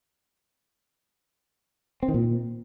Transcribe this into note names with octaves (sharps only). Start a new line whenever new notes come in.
C4
D#3
A#2